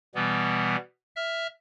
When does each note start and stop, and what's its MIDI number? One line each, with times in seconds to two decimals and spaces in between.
0.15 0.76 47
0.15 0.76 52
0.15 0.76 55
0.15 0.76 59
1.16 1.47 76
1.16 1.47 89